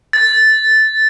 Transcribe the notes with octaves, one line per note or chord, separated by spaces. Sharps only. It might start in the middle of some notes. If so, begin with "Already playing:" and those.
A6